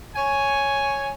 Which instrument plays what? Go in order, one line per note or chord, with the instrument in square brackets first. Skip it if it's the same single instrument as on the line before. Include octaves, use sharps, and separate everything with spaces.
[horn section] C#5 G#5